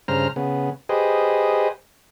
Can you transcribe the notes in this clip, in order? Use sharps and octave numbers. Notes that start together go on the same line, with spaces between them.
G2 C#3 C5 A#5 F6
C#3 B3
G4 G#4 B4 C5 D#5